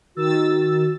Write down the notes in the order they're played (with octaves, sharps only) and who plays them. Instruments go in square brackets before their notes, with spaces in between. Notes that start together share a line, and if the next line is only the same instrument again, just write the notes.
[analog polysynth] D#3 E6 A6 [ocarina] F#4